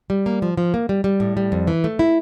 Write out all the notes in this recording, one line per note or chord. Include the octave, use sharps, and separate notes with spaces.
G3
A#3
F3
F3
A#3
G3
G3
A2
G3
F2
E3
A3
E4